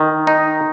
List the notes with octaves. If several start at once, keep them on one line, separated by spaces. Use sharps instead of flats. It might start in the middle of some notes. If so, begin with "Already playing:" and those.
Already playing: D#3
D#4